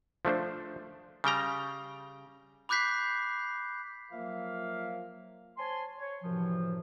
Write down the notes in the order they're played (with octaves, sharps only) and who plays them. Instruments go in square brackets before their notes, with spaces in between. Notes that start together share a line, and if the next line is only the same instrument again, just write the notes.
[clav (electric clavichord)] F3 A3 D4 C5
C#3 G3 G5 A#5
[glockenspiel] B5 D6 F#6 G6 B6 C7
[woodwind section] F3 F#3 A#3 A#4 E5 F5
C5 C#5 G#5 A5 C6
C#5
F#2 A2 C3 E3 F3